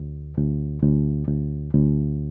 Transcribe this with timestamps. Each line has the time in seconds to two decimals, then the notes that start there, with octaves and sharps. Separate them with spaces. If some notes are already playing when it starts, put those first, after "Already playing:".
Already playing: D2
0.37 D2
0.82 D2
1.28 D2
1.73 D2